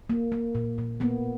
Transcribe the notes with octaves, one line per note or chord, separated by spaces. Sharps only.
A#3
A#3
A#2
A#2
A#3 B3